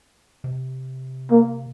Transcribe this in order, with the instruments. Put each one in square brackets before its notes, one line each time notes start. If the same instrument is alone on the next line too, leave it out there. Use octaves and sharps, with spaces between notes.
[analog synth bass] C3
[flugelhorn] A#3